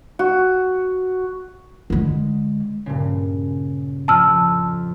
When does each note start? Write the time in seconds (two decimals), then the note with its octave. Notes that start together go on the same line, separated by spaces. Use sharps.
0.19 F#4
1.90 D3 G#3
2.86 G2 A#2 C#3
4.08 F2 A2 A5 E6 F6